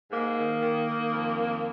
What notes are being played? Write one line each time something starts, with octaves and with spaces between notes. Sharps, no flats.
G#2 A#3
D#3
D#3
D#3
F2
D#3